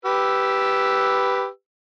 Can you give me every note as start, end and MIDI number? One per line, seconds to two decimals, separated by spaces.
0.05 1.48 67
0.05 1.48 71
0.05 1.48 88